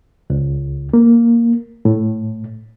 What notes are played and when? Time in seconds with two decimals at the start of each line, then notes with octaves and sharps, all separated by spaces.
0.30 C#2
0.93 A#3
1.85 A2